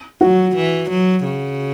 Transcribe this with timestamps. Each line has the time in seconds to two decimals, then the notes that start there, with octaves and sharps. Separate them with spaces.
0.21 F#3 F#4
0.55 E3
0.90 F#3
1.24 C#3